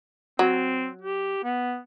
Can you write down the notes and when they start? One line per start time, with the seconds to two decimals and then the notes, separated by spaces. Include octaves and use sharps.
0.39 F#3 C4
1.01 G4
1.44 B3